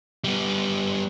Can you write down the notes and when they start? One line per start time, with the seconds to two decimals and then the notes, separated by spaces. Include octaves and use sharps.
0.24 G3 B3